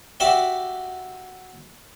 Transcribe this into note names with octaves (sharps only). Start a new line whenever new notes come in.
F#4 G4 D5 E5 F#5 G5